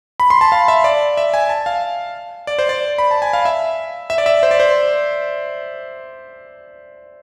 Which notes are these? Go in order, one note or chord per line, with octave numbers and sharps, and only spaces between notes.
B5
C6
A5
F5
E5
D5
E5
G#5
A5
F5
D5
C5
D5
B5
A5
G#5
F5
E5
E5
D5
E5
C5
D5
C5